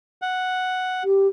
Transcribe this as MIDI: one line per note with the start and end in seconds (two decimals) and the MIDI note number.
0.22 1.03 78
1.04 1.27 67